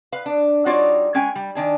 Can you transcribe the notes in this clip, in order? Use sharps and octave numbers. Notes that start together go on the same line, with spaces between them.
B4 F5
D4
G3 D#4 F4 F#4 C#5 D5
G#3 C#4 G5 G#5
G3
D#3 D4 G#5